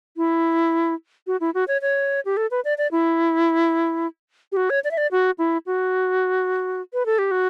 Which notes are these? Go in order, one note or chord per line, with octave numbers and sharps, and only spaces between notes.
E4
F#4
E4
F#4
C#5
C#5
G4
A4
B4
D5
D5
E4
G4
F#4
C#5
D5
E5
D5
F#4
E4
F#4
B4
A4
G4
F#4